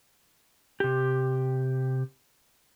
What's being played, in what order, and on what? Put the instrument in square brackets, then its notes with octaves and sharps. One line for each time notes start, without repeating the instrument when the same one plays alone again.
[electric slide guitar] C3 G4